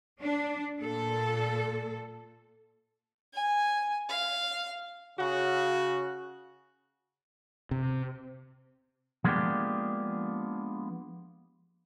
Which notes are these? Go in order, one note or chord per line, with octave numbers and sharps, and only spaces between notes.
D4
A#2 A4
G#5
F5
C#3 F#4
C3
F3 G#3 A#3 B3 D4 G4